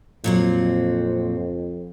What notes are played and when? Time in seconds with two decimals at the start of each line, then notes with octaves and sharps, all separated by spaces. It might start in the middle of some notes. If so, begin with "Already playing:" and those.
0.24 F2 A#2 F#3 C4